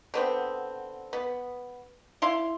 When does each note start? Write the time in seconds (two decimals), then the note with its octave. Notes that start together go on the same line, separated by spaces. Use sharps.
0.14 D3 B3 C4
1.13 B3
2.22 E4 F5 C6